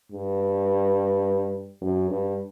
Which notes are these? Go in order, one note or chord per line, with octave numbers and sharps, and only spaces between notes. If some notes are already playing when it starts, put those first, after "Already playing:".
G2
F#2
G2